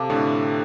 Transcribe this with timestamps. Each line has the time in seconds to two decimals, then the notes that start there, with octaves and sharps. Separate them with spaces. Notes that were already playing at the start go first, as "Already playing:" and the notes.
Already playing: C3 A4 F5 A5 D6
0.10 A2 D3